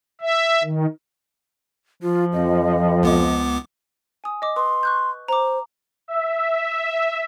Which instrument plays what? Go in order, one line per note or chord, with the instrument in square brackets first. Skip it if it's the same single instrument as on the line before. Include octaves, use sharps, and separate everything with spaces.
[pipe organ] E5
D#3
[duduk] F3 [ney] F4
[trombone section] F2 [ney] D#5
[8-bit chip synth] C#2 B3 D6
[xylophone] G#5 D#6
D#5 D6
[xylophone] B4 D#6 [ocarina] C6
[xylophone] C#6 F#6 G6
[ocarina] C5 [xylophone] A#5 D6
[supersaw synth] E5